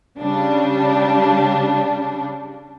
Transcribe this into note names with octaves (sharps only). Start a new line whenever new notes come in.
C#3 G3 D4